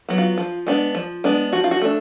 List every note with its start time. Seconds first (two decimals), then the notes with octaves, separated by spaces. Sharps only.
0.09 F#3 B3
0.18 F4
0.37 F3
0.67 G#3 B3 D4
0.95 F3
1.24 G#3 B3 D4
1.53 F3 F#4
1.64 F4
1.71 F#4
1.81 A3 D4